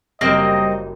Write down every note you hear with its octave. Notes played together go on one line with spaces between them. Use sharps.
F#1 G3 A#3 C4 D#4 G4 D#5 E7